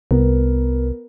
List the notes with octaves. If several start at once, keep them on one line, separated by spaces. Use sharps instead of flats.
C2 B3 A#4 B4